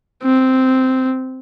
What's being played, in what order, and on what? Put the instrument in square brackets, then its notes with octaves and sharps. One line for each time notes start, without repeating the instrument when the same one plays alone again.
[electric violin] C4